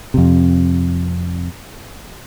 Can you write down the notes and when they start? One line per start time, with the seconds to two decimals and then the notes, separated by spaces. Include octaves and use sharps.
0.14 F2 C3